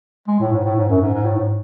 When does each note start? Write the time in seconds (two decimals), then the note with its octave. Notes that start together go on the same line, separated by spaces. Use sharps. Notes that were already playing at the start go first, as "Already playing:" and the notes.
0.28 G#3
0.40 A2
0.52 G#2
0.64 A2
0.76 G#2
0.89 F#2
1.01 G#2
1.14 G#2
1.26 A2
1.37 G#2